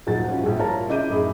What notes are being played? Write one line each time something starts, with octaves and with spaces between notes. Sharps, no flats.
D#1 F3 F#3 D#4 F#5 A6
C#4 E4 F4 C5
A#1 F3 G3
E4 F4 A#4 C#5 A5 A#5
C#3 E4 D#5 D6 G6 D#7
F#2 A2 D#4 G#4 B5